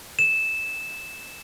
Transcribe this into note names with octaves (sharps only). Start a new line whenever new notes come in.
E7